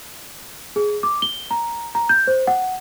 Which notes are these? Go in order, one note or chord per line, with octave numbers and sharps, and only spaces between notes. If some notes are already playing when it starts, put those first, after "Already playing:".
G#4
D6
G7
A#5
A#5
G6
C5
F#5